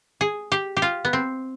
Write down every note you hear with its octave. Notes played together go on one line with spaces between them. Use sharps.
G#4
G4
G4
F4
B3
C4